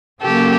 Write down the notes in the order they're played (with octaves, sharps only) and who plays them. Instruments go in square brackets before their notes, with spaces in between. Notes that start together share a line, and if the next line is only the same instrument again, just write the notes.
[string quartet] C#3 F#3 A#3 G4 A4